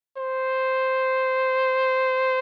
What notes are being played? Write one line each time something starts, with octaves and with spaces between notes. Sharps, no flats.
C5